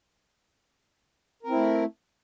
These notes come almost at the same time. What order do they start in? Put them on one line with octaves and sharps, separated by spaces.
A#4 C4 E4 A3